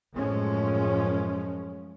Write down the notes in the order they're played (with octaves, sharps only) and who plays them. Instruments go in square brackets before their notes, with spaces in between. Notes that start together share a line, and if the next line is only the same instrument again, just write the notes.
[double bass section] F#2 A2 F3 G#3 C#4